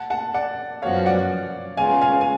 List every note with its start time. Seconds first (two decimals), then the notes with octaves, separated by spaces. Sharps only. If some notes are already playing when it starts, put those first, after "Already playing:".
Already playing: F#5 A5
0.10 F#5 A5
0.34 D5 F#5
0.82 F#2 F3 B3 F#4 C#5 F5
1.06 D5 F#5
1.77 C#3 G#3 B3 F4 F5 G#5
2.01 F5 G#5
2.21 G#5